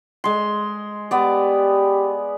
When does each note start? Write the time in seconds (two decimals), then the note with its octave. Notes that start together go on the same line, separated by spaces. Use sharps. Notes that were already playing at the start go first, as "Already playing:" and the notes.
0.24 G#3 C6
1.11 B3 G4 D5